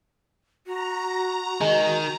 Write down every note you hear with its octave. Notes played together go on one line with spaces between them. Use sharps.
F#4 A#5
D#3 G#3